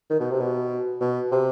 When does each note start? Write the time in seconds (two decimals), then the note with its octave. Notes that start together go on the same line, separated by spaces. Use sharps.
0.10 D#3
0.20 B2
0.31 C3
0.40 B2
1.01 B2
1.32 C3